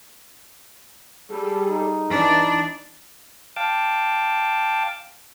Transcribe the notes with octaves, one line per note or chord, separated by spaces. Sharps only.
G3 G#4 A4
D#4
E3 D4
F5 G5 A5 D6